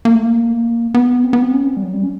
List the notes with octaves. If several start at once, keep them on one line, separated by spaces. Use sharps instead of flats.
A#3
A3
A#3
B3
C4
B3
C4
C#4
C4
G3
F#3
G3
C#4